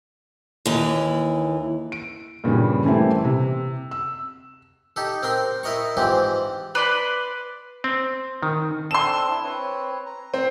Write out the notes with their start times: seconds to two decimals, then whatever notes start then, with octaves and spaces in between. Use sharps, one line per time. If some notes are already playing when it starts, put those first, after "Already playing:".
0.66 D#2 E3
1.92 D7
2.44 G2 A#2 C#3 E3 G3
2.85 E3 G3 A3 A#3 C4 E4
3.25 C3
3.91 E6
4.96 D#4 G4 A4
5.23 C4 A#4 G5 C6
5.63 E4 A#4 D#5 A#5 C#6
5.97 G#2 E3 F3 C4 G4
6.75 B4 D5 C6
7.84 C4
8.43 D#3
8.91 C4 D4 A4 C6 E7
9.30 E4
9.44 C4 B4 C#5
10.06 A#5
10.34 C4